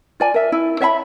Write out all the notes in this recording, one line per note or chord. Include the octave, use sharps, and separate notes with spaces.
F4 D5 G#5
A#4 E5
E4
C#5 E5 F5 B5